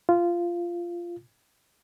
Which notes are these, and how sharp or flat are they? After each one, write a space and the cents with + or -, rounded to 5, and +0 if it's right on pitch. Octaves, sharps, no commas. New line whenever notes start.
F4 -15